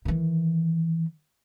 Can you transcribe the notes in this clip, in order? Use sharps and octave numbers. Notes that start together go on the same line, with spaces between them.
D#3 E3